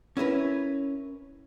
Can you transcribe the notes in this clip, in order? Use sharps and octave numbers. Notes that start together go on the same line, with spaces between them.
C#4 E4 A#4 B4